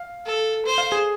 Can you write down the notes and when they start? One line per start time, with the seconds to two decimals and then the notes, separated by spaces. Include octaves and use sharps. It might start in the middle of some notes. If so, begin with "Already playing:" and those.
Already playing: F5
0.26 A4
0.66 C5
0.78 F5
0.92 G#4